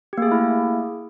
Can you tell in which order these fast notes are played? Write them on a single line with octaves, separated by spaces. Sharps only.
G4 A#3 G#4 A3 E4